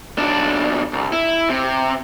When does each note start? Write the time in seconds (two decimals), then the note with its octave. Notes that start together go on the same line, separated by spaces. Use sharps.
0.18 B1 D4
0.93 C2
1.12 E4
1.50 C3